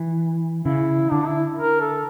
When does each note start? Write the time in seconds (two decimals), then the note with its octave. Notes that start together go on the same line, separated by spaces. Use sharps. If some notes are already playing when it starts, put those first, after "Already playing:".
Already playing: E3
0.65 C#3 E4
1.11 D3 D4
1.26 E4
1.58 A#4
1.81 A4